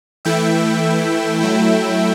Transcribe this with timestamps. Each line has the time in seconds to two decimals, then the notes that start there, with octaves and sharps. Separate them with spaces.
0.25 E3 A3 E4 E5 G5
1.41 F#3 A3 E4